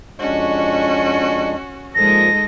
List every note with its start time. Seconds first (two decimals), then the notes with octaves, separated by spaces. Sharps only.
0.19 F2 G#3 C#4 D4 F#4
1.95 A#2 F3 G#3 D#4 A4 A#6